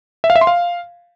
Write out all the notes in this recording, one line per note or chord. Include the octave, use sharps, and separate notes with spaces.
E5
F5
E5
C6
F5